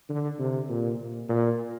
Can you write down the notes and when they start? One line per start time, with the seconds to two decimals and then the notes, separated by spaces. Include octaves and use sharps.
0.09 D3
0.39 C3
0.69 A#2
0.98 A#2
1.29 A#2